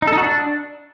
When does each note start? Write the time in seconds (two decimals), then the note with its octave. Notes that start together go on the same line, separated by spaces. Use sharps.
0.02 D#4
0.07 A4
0.12 D#4
0.18 F#4
0.23 D4